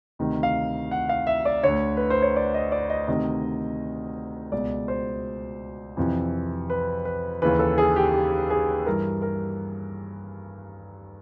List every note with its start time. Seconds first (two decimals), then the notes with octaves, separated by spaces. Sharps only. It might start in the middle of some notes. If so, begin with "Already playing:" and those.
0.19 D2 C3 D#3
0.43 F5
0.91 F#5
1.09 F5
1.27 E5
1.45 D5
1.63 D2 D3 C#5
1.97 B4
2.10 C5
2.22 C#5
2.36 D5
2.54 D#5
2.72 D5
2.90 D#5
3.08 D2 C3 D#3 D#5
4.52 C#2 B2 D5
4.88 C5
5.97 F2 C3 E3
6.70 B4
7.05 B4
7.42 D#2 C#3 E3 B4
7.59 A4
7.78 G#4
7.96 G4
8.13 G4
8.50 G#4
8.86 G2 E3 A#4
9.22 A#4